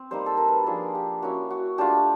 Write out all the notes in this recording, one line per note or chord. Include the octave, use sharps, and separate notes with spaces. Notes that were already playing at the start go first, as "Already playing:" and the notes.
Already playing: C4
G3 A#3 D#4 C5
A4
A#4
B4
F3 A#3 D4 F4 G#4 A4
G4
A#3 C#4 E4 F#4
F#4
A3 D4 F4 G4